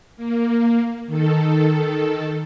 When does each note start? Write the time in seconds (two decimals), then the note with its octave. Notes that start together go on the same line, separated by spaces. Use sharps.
0.17 A#3
1.07 D#3 A4